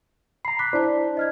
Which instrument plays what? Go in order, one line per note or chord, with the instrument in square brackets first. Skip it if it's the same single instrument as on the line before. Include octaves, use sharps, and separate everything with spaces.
[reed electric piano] A#5 B5 [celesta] C7
[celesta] D6 F#6 B6
[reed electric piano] D4 E4 C5 [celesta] D5 A5
[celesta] D#5 F6 G#6